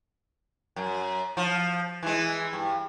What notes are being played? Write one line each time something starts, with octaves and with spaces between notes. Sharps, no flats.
F#2
F3
E3 G#3
G2